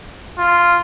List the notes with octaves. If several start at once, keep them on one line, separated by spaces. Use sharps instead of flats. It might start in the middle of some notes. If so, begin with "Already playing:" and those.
F4